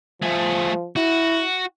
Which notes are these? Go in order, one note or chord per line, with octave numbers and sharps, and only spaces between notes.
F3 A3 G#4
E4 F#4